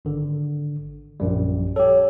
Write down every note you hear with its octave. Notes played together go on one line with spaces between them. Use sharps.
G#1 D3
A#1 F#2 G3
G4 A4 C#5